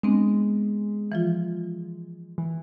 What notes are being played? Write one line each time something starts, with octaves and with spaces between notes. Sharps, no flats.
G#3 B3 C4 D4
E3 F3 F4
E3